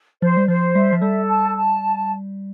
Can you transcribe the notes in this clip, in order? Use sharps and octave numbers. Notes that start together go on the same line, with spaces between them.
F3 C5
G3
F3 C5
G3 E5
F3
G3 A4
A5
A5